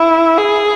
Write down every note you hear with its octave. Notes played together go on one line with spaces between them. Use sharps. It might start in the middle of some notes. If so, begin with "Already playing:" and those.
Already playing: E4
G#4